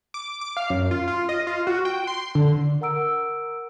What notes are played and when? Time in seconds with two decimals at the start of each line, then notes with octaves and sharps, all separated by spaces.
0.14 D6
0.41 D6
0.57 F5
0.70 F#2
0.91 F4
1.08 F4
1.29 D#5
1.47 F4
1.67 F#4
1.85 G5
2.07 C6
2.35 D3
2.81 A#4 F#5 A#5 E6 D7